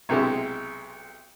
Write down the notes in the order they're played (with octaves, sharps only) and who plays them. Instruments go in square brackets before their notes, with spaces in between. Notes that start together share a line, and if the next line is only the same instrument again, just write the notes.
[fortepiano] B1 C3 G#3 E4